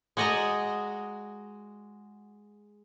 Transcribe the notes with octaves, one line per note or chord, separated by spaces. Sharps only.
G#3 F#4 D5 D#5 A#5